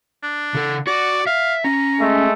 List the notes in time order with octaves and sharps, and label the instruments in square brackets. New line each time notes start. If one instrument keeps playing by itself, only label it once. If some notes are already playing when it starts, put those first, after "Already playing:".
[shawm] D4
[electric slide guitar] C#3 A4
[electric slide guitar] F#4 [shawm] D5
[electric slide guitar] E5 [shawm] F5
[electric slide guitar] C#4 [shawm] A#5
[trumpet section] G#3 A3